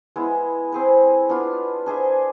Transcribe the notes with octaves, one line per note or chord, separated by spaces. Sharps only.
G#3 B3 E4
C4 G#4 B4
B3 D4 F4
D4 G#4 C5 E5